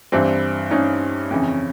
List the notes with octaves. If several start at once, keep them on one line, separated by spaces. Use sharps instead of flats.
G2 E3 C4 D4
C#4 D#4
F2 C#3 E3